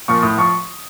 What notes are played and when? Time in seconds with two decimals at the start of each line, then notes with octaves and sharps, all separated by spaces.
0.08 A#2 F3 C#6
0.22 A2 D#6
0.37 F3 C#6